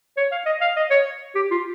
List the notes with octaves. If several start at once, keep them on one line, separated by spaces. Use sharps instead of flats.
C#5
F5
D#5
F5
D#5
C#5
G4
F4